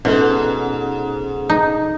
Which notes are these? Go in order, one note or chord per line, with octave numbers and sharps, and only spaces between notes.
G#2 B2 C#4 A4
D#4